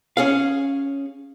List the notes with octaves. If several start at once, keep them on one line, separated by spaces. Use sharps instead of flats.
C#4 G#4 F5